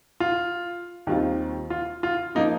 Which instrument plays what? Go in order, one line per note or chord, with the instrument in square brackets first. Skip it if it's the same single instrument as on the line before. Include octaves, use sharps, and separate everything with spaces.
[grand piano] F4
[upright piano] D#2 D#3 G3 C4 F4
[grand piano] F4
F4
[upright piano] F3 A#3 F4 [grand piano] D#4